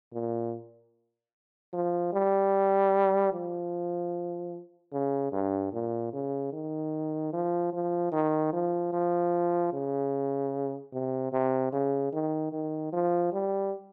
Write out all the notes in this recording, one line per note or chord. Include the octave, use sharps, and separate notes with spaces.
A#2
F3
G3
F3
C#3
G2
A#2
C#3
D#3
F3
F3
D#3
F3
F3
C#3
C3
C3
C#3
D#3
D#3
F3
G3